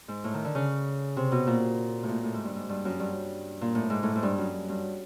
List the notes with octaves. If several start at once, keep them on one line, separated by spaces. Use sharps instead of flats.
G#2
A2
D#3
D3
C#3
C3
B2
A#2
A2
A#2
A2
G#2
G2
G#2
G2
F#2
G2
A#2
A2
G#2
A2
G#2
G2
F#2
G2